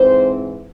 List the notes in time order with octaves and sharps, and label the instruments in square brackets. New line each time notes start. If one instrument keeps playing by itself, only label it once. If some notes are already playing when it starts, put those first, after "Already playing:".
Already playing: [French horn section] G#2 E3 C4 C5